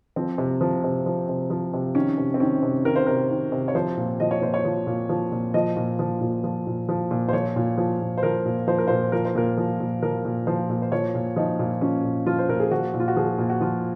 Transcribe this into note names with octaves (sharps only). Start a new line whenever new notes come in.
F3 C4
C3
F3
C3
F3
C3
F3
C3
D#3 C#4
C3
C4
D#3 C#4
C3
D#3 A#4
C5
C3 A#4
D#3
C3
C#5
F3 C5
A#2
F3 D#5
C#5
A#2 C5
C#5
F3
A#2
F3
A#2
F3 D#5
A#2
F3
A#2
F3
A#2
F3
A#2
C5
F3 C#5
A#2
F3
A#2
C5
F3 A#4
A#2
F3 C5
A#4
A#2 C5
F3 A#4
C5
A#2 A#4
F3
A#2
F3 A#4
A#2
F3 C5
A#2
C5
F3 C#5
A#2
F3 D#4
A#2
F3 C#4
A#2
F3 F4
C5
A#2 A#4
G#4
F3 F#4
A#2
F4
F#4
F3 G#4
A#2
F#4
F3 F4